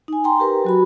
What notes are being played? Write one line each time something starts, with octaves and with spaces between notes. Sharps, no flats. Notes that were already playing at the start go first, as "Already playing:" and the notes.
D#4 G#5
G5 A#5 C6
G4 A#4 B4
F#3 F#4 B5